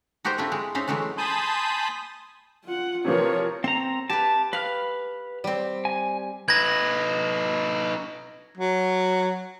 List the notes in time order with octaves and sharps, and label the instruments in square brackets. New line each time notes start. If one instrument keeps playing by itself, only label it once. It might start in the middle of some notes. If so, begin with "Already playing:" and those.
[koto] D#4 F#4 G4 A#4 C5 D#5
A3 C4 D4 E4 F4
G#3
C4 C#4 D#4 E5 F5
E3 F#3 G#3 A3 D4
[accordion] G#5 A5 B5 C6 D#6 G6
[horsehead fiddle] F4 F#5
[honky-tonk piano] C3 E3 F3 [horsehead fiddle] A#4 C#5
[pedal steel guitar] C4 A#5 [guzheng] A4
[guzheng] G4 B4 [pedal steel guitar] A5
[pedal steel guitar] B4 F6 [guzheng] F5
[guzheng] G3 C4
[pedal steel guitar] G#5
[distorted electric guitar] D#4 B4 [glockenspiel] G#6 A#6
[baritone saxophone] F#3